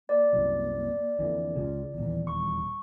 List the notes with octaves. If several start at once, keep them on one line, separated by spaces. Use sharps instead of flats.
A#3 D5
C2 F#2
F2 D3 E3
C#2 C#3 F4
D#1 E2 E3
G3 C#6